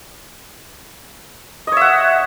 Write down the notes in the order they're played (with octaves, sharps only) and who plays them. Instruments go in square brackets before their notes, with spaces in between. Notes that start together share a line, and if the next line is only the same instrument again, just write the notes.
[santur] D#5
C#5
E5
F#5